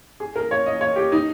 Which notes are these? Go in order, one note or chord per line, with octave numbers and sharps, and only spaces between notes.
G#4
A#4
C#5
D#5
C#5
G4
D#4